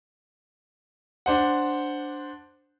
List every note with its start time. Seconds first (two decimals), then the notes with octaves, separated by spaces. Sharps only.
1.26 D4 C5 F#5